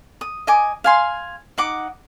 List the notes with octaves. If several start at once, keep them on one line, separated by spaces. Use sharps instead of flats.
D#6
D#5 G#5 D6
F5 G#5 C6
D#4 F#5 D6